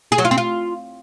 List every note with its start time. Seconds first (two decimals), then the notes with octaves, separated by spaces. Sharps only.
0.12 G#4
0.18 F#3
0.25 F4
0.31 C4
0.38 F4